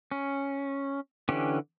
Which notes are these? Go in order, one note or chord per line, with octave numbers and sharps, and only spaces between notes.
C#4
D3 E3 C#4 G4